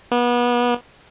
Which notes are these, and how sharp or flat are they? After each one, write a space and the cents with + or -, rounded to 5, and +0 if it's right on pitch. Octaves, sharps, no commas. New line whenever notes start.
B3 -30